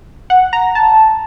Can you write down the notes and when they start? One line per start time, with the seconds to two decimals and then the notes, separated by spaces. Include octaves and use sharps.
0.30 F#5
0.53 A#5
0.75 A5